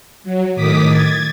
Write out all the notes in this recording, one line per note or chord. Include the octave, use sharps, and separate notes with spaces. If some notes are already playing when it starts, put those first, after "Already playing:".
F#3
A2 D#3 D6 D#6 B6
G#6 A6